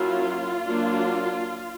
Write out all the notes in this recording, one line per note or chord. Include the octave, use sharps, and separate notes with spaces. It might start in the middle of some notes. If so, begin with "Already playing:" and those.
Already playing: F#3 A#3 C#4 E4 F4
F#3 A#3 D4